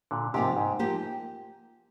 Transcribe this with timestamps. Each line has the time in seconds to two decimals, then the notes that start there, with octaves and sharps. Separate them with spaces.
0.11 A#2 D3
0.34 G#2 C3 F3 A#3 D#4 G4
0.57 G#2
0.79 F3 A#3 D#4 G4